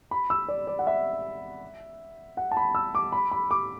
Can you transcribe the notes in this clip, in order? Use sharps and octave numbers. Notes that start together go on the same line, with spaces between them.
B5
E6
D5
D5
F#5
E5
F#5
A5
B5
E6
D6
B5
B5
D6